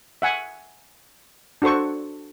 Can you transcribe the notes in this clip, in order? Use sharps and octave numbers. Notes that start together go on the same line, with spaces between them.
E5 F#5 G#5
D4 F#4 A4 C5 C#6